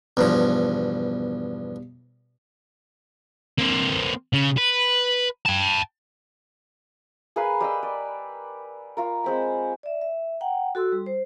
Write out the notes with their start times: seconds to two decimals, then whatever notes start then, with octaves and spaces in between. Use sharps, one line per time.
0.17 E2 G2 B2 F3
3.58 A#3 C4
4.33 C#3
4.57 B4
5.45 G5 A5
7.36 G#4 A#4 B4 F5
7.60 G3 D#5 E6
7.83 D5
8.97 F4 A#4
9.24 G#3 C4 B5
9.83 D5 E5
10.01 E5
10.41 F#5 G5 A#5
10.75 F#4 A4 C6 E6
10.92 G3
11.06 C5